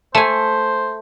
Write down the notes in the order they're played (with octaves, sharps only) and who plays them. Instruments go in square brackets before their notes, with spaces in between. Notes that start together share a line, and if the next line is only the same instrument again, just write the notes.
[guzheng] A3 G#5 [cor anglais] C5